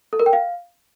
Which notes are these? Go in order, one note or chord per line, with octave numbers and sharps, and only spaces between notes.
A4
A#4
G5
F5